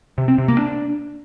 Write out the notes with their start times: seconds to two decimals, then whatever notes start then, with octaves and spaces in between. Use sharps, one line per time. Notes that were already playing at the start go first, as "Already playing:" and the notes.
0.18 C3
0.28 C4
0.38 C3
0.48 A#3
0.59 D4